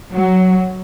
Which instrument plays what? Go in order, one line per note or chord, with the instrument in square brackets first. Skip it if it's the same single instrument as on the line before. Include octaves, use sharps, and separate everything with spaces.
[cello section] F#3